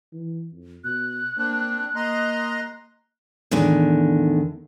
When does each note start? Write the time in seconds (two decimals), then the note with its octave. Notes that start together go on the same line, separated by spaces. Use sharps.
0.13 E3
0.53 F2
0.84 B2 F#6
1.38 A#3 C4 D4
1.96 A#3 D#5 A#5 C6
3.51 E2 A2 D3 D#3